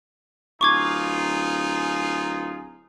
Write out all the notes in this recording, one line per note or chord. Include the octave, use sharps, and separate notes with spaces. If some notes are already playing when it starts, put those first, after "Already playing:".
D1 D#4 F4 G#4 C#6 D6 G#6